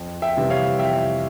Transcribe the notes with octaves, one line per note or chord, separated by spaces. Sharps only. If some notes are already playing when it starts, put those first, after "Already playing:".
Already playing: F2
E5 G5
C3 E3 G3
C#5 F5
F2 E5 G5